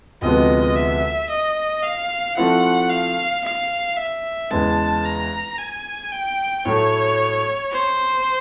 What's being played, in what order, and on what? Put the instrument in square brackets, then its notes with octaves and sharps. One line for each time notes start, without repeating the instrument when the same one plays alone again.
[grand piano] D2 C3 F3 G#3 B3 [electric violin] D#5
[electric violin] E5
D#5
F5
[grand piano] F3 A3 C4 E4 [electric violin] F#5
[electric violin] F5
F5
E5
[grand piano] E2 C#3 E3 G#3 [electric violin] A5
[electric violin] A#5
G#5
G5
[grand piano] A2 F#3 A3 [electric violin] C#5
[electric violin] C5